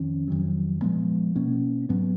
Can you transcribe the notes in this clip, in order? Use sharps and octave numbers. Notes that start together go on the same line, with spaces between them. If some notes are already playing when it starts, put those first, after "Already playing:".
Already playing: F2 D#3 C#4
F2 D#3 F#3
A#2 F3 G#3 B3
B2 A#3 C#4
G#2 F#3 B3